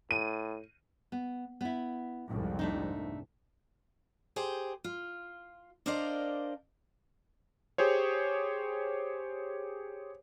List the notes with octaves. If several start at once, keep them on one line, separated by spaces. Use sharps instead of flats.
A2 D#7
B3
B3 E4
C2 F2 G#2
A3 D4 D#4
G4 G#4 C5
F4
D4 A#4 C5 D5 D#5 F5
G4 G#4 C5 C#5